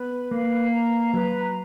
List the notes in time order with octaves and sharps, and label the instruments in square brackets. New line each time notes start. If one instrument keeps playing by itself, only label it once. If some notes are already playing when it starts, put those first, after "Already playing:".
Already playing: [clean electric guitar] B3 [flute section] B4
[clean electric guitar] A#3 [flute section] F5
[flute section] A#5
[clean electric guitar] F#3 [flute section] B4